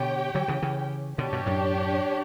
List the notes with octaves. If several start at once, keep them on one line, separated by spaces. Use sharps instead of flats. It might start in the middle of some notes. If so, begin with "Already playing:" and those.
Already playing: B2 D3 G4 C#5 G5
D3 F#3
C#3 E3
C#3 E3
B2 D3 D4 G4 C#5
G2 B2
F#2 A2